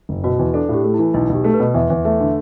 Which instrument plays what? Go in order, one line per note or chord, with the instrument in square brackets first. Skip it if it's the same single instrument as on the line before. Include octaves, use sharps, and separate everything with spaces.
[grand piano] F#1
[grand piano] B2 [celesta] F#4
[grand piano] E2
[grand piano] D4 [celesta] A4
[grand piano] A2 [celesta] G4
[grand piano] A3
[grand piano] E3 [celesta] E4
[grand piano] B1 [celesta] E4
[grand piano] B1 [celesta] G4
[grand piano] A3
[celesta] B4
[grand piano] B2
[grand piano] E2 [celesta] E5
[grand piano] E2
[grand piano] A3 [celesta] E5
[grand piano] D3